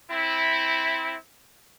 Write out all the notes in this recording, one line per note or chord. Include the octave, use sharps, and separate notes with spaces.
C4 E4